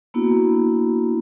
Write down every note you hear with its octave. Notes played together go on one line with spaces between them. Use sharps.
A#3 B3 D4 E4 F#4